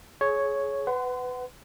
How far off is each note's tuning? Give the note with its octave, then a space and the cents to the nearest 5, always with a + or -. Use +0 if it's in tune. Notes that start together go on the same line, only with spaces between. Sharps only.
G#4 +25 C#5 +0
B4 +20 F#5 +15 C6 -30